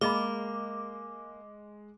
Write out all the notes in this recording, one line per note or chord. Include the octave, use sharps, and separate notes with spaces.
G#3 A#3 G#4 D#5 B5 D6